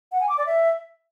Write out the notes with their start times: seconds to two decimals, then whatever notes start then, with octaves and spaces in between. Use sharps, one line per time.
0.12 F#5
0.20 G#5
0.29 D6
0.38 D5
0.46 E5